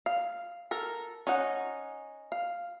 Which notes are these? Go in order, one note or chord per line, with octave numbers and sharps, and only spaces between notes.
F5
A4 A#4
C#4 D#4 F#5
F5